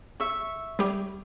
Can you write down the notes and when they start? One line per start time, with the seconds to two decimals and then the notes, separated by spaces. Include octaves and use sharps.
0.20 E5 C#6
0.79 G3 G4